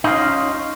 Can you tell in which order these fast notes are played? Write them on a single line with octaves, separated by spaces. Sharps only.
D#4 F4 C#4